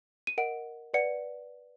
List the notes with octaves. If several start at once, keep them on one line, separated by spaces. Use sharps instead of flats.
D#7
A#4 D#5 F#5 D7
B4 D5 F#5 C#7